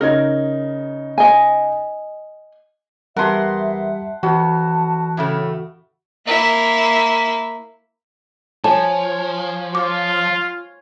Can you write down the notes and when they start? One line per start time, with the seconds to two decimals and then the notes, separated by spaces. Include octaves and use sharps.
0.01 C#3 D#4 A#4 G#6
1.18 D#5 G#5
3.16 E2 G3 G4 A#4 E5 F#5 A5 C6
4.23 F2 E3 F#4 A5
5.17 A2 C#3 A3
6.26 A#3 E4
8.64 F3 C#5 G#5 A5
9.75 F4 D6